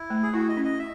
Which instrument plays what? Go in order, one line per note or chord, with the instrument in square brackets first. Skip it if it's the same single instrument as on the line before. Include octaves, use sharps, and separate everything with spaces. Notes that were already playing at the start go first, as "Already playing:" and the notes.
Already playing: [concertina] E4
[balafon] A3
[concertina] G#4
[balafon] E4 [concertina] F#4
[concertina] D#5
[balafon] C#4
[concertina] D#5
E5